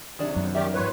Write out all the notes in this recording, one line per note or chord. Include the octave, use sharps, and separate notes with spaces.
C3 D#3 F#3 D4 G#4 C#5
F#2 B3
D#3 G3 G4 A#4 D5 E5
F2 G#2 B4 C#5 C6